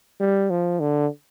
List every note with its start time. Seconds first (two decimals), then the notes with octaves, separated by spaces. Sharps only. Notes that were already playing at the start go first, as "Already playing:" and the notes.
0.20 G3
0.50 F3
0.80 D3